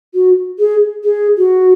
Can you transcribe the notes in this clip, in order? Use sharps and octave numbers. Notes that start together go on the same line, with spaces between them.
F#4
G#4
G#4
F#4